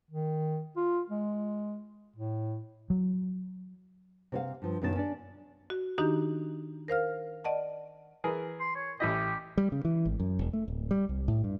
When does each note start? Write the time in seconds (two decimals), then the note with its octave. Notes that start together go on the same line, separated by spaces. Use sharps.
0.11 D#3
0.77 F4
1.10 G#3
2.16 A2
2.90 F#3
4.32 C3 C#5 F5
4.62 G2 F3
4.82 F#2 B2 D#3 C#4 F4 A5
4.95 C#4 D4 D5
5.70 F#4
5.98 D#3 D4 D#4 F#4 G4 A#5
6.88 A#4 C5 F5 F6
7.44 D5 D#5 F#5 A5
8.24 E3 G#4 A#4
8.60 C6
8.76 C#5
9.00 A1 E4 G4 D#5
9.57 G3
9.72 C#3
9.85 E3
10.05 G#1
10.20 F#2
10.39 E1
10.53 A3
10.68 D1
10.91 G3
11.09 C2
11.28 A2
11.44 G2